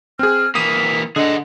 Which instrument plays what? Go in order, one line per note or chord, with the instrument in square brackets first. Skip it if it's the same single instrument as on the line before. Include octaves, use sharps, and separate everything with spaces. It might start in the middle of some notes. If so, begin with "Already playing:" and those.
[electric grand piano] C4 G#4 [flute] F6
[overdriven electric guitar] E3 A#3 [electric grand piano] D#6 D#7 [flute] B6
[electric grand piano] D3 [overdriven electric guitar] G#4 F#5 [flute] D#5